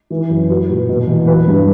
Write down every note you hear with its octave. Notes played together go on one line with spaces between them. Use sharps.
E3
F#2
F#3 B4
A#2
B2
E2
F#3 B4
G2